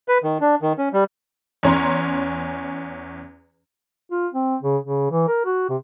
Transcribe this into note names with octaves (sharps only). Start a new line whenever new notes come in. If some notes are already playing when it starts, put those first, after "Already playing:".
B4
D#3
D4
D#3
C#4
G3
E2 C#4 A#5 C6
F4
C4
C#3
C#3
E3
A#4
F#4
C3